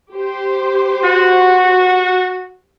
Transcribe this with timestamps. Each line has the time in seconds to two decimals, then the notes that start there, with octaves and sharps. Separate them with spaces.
0.11 G4 C5
1.04 F#4